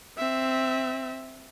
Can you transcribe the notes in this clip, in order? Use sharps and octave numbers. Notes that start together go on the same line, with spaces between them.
C4 E5